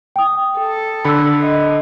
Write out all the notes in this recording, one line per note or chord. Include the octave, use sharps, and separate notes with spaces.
G5 D#6
A4
D3 B5 E6 C#7
D#5